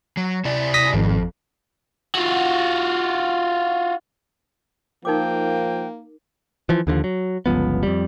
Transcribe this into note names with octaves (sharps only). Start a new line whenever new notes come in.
F#3
C3 E4 D5
D#6 A#6 B6
G#1 F2
F4 F#4
F3 A#3 D#4 A#4 G5 D6
E3 F3
D#2 D3 D#3 F3
F#3
G1 C#2 F3 B3
F2 G3